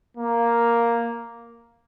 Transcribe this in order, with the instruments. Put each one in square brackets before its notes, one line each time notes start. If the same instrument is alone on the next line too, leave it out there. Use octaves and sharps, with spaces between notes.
[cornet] A#3